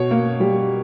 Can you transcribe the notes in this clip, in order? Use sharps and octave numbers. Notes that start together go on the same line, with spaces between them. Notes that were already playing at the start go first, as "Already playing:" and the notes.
Already playing: B2 C#5
A#3
G3